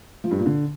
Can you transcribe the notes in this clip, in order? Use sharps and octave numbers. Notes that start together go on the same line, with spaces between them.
F3
G2
A#2
D3